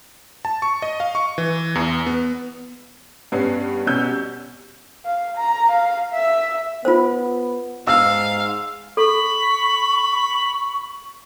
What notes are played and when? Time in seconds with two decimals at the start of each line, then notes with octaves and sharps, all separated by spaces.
0.45 A5
0.62 C#6
0.82 D#5
1.00 F5
1.15 C#6
1.38 E3
1.75 E2
2.07 B3
3.32 G2 B3 C#4 C7
3.87 C2 B2 C#4 E6 G6
5.05 F5
5.37 A#5
5.71 F5
6.14 E5
6.85 B3 F4 C5
7.87 G#2 F5 E6
8.97 A4 B5 C#6